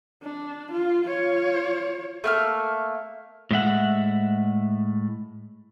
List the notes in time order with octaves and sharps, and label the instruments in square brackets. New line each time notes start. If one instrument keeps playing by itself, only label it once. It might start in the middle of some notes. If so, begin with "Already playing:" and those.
[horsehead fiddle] D4
F4
F4 C#5
[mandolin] A3 A#3 F6
[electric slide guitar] A2 G#3 E5 F#5